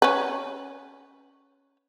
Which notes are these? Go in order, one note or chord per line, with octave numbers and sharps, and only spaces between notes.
C#4 B4